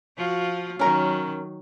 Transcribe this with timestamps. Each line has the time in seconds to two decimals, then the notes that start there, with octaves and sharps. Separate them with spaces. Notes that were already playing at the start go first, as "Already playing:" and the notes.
0.18 F3 F4 F#4
0.79 D#3 F#3 C#4 A#4